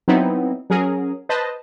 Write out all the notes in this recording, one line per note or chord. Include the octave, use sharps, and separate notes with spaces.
F#3 B3 C4 D#4 E4
F#3 C#4 G#4 A#4
B4 C5 D#5 A5